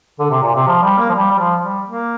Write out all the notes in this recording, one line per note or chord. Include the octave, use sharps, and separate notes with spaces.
D3
C3
A#2
C3
F3
G3
A#3
F3
G3
G3
F3
G3
A#3